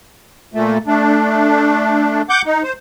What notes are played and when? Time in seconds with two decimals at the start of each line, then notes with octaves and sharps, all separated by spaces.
0.54 A#2 A3
0.87 A3 D4
2.29 F#5 D6 G6
2.46 D#4
2.63 C5